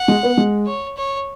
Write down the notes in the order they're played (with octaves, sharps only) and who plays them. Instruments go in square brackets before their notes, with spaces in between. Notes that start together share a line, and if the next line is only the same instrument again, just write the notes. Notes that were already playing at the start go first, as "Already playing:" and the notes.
Already playing: [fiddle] F#5
[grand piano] G#3
B3
G#3
[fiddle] C#5
C#5